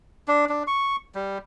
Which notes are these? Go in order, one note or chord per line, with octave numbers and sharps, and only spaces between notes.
D4
D4
C#6
G3